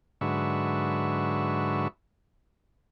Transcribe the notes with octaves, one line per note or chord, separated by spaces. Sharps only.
G#2 D3 F#3 B4 E5 C#6